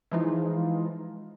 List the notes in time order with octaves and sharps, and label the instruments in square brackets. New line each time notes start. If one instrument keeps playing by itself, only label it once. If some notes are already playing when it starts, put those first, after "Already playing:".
[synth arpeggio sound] E3 F3 G#3 D#4 F4